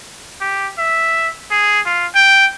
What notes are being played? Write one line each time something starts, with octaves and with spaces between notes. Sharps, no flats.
G4
E5
G#4
F4
G5